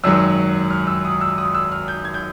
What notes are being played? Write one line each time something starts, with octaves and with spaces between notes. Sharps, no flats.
G#1 F#2 D#3 F#3 E6
F6
E6
D#6
E6
D#6
E6
F6
G6
G#6
G6